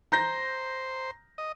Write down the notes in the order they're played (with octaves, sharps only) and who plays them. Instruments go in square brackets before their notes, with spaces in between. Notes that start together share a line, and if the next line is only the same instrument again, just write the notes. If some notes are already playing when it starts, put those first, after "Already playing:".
[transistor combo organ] C5 [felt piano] A#5 G6 A#6
[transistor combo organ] D#5